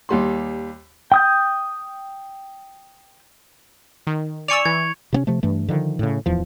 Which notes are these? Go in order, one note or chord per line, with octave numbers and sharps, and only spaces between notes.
D#2 G3 C6
G5 D#6 G6
D#3
D5 G#5 C#6 E6 C#7 F7
E3 G#6
C3 B3 C#4
C3 F3 A3
G2 E3 A3
D3 D#3 F3
A2 C#3
D1 E2 F3